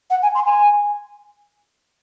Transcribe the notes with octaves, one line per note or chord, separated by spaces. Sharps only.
F#5
G#5
C6
G#5